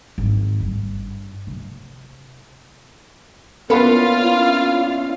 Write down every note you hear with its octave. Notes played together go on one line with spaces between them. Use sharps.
G#1
G2
C3
A#3 B3 C#4 D4 E4 F4 F5 B5